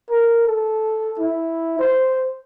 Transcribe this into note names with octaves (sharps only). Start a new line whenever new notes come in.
A#4
A4
E4
C5